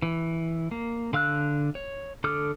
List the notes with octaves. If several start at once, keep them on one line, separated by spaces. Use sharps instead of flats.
E3
A#3
D3 F5 E6 F#6
C#5
D3 A4 D6 D#6 F6